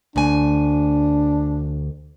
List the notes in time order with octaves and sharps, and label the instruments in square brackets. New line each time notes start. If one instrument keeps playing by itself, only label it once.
[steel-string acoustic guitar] D2 G#5 [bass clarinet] D4